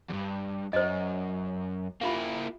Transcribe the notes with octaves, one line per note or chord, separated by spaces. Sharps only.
E2 G2
F#2 C5 D#5
A#3 E4 F4 G4 F5